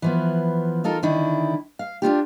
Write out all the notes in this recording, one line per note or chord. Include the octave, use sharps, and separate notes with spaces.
E3 F3 B3
D#4 F4 A4 A#4
D3 D#3 E4
F5
D4 D#4 F4 G4